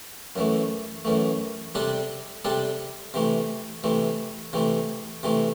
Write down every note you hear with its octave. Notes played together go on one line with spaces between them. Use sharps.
F#2 E3 A3
F#2 E3 A3
C3 G3 D4 A4
C3 G3 D4 A4
C3 E3 A3
C3 E3 A3
C3 E3 A3
C3 E3 A3